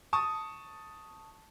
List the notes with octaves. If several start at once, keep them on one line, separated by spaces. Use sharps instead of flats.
A5 C#6 D#6